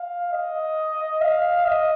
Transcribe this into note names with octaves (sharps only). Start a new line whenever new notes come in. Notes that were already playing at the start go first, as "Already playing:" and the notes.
Already playing: F5
D#5
F5
D#5